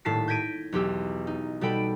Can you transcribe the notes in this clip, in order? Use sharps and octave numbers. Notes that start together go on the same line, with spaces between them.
D#1 A2 A5 B6 C7
G6 G#6 A#6 B6 D7 D#7
B1 E2 G4 E6
D#4
B2 G3 A4 G5 B5 D7